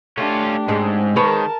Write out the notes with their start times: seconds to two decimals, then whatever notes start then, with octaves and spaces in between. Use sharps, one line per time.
0.17 A3 C#4 D4 F4 G4
0.68 G#2 G#3 C4 C#4
1.16 D#3 G#3 A#4 B4 C#5 A5